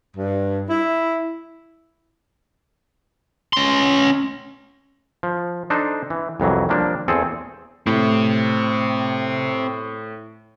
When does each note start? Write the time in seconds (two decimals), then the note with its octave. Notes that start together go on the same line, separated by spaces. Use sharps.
0.16 G2
0.69 E4
3.53 C#4 C6
5.23 F3
5.70 D4 D#4 A4 C5
6.10 E3
6.40 C2 F2 E3 F#3
6.69 F3 G3 A#3 D4
7.08 E2 C4 G#4 A4
7.86 A2 C4 G4